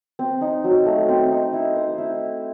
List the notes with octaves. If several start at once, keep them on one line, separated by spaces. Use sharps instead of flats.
C4
D#4
F#3
A3
C4
D#4
E4
C5
E4